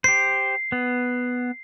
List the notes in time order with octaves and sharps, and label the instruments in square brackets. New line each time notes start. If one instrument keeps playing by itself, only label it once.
[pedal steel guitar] G4 C5 [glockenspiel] C7
[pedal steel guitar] B3